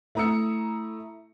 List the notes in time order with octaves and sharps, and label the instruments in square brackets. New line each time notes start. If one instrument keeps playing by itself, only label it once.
[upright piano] A3 E4 A#5 D#6 E6 C#7